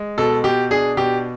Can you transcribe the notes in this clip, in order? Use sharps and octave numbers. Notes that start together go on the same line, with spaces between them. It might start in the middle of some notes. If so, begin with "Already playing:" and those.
Already playing: G#3
B2 A4
B2 G4
D4 G#4
B2 G4